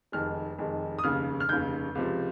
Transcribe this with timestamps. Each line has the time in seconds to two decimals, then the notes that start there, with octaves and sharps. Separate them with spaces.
0.12 F1 F2 D#3 G#3 F6
0.58 F1 F2 D#3 G#3
0.99 D#6
1.04 F1 D#2 C#3 F6
1.40 F6
1.49 F1 D#2 C#3 G6
1.95 C#2 C3 F3